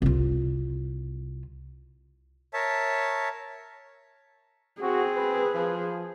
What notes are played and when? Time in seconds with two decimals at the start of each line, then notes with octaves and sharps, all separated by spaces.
0.02 C2 F4
2.54 A#4 C#5 E5 A5
4.82 C4 F#4 G#4
5.15 B4
5.55 F3